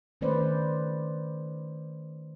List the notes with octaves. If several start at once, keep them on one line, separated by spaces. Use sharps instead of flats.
D#3 A3 C#4 B4 C5 D5